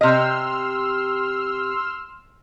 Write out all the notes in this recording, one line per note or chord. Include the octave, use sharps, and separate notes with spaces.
C3 D#5 C6 E6 F6